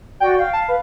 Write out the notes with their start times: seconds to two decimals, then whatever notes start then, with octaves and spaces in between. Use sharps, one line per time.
0.20 F#4 D5 G5
0.38 F5
0.53 A5
0.68 B4